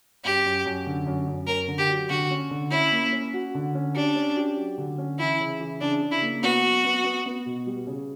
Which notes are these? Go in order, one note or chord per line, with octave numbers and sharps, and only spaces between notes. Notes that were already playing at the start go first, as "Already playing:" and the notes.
F#2 G4
F#2
F#2
D3
F#2
F#2
C#4 A#4
D3
G4
F#3
D3 F#4
C#4
D3
C#4 E4
A#3
C#4
F#4
D3
C#4
D4 G4
C#4
G4
F#3
D3
C#4
E3 E4
C#3
E3
C#3 D4
C#3
E4
A#3
B3 F#4
F#3
B3
B3
B3
B2
G3
C#3